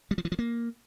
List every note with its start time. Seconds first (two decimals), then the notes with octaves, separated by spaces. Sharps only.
0.11 G3
0.18 F3
0.25 E3
0.32 F3
0.39 A#3